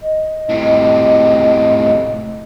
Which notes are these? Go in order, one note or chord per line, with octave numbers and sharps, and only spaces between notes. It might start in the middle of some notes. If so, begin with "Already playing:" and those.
D#5
A2 C3